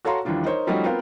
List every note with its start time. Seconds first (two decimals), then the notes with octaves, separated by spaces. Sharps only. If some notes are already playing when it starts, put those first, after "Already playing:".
0.05 F#4 A4 C#5 F5 A#5 C6
0.25 D#2 E3 F3 G3 D4 F4
0.45 D#4 A#4 C5 C#5
0.67 F3 G3 A3 C#4 D#4 F#4
0.84 B3 C4 F4 A#4 C5 F5